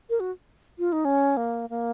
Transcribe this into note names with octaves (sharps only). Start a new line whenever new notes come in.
A#4
F#4
F4
D#4
C#4
A#3
A#3